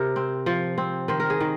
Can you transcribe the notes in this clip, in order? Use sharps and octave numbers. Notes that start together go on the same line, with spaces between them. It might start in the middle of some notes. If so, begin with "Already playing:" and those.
Already playing: C3 A#4
C4
F3
C4
D#3 C5
A#4
G#4
D#3